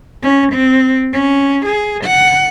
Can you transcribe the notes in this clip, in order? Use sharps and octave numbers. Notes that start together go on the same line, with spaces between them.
C#4
C4
C#4
G#4
F#5